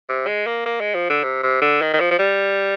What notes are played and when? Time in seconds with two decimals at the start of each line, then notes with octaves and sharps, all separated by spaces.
0.09 C3
0.27 G#3
0.47 A#3
0.66 A#3
0.80 G#3
0.94 F3
1.10 D3
1.23 C3
1.43 C3
1.62 D3
1.82 D#3
1.94 D#3
2.00 F3
2.11 F3
2.19 G3